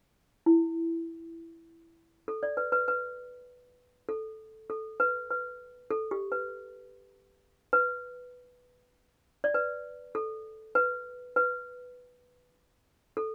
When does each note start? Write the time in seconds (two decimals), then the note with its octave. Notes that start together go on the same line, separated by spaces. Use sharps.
0.46 E4
2.28 A4
2.43 D5
2.57 B4
2.72 B4
2.88 B4
4.09 A4
4.70 A4
5.00 B4
5.30 B4
5.91 A4
6.11 G4
6.32 B4
7.73 B4
9.44 D5
9.54 B4
10.15 A4
10.75 B4
11.36 B4
13.17 A4